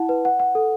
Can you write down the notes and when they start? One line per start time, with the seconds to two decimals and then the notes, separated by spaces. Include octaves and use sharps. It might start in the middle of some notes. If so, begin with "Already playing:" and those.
Already playing: E4 F#5 A5
0.09 B4
0.25 F#5
0.40 F#5
0.55 A4